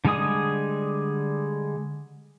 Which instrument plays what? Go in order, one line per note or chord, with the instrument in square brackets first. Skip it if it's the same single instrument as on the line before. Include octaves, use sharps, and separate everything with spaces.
[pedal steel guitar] D3 G3 G#3 G#4 D#6